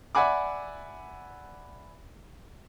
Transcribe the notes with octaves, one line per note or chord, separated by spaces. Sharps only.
D5 E5 F#5 G#5 B5 D6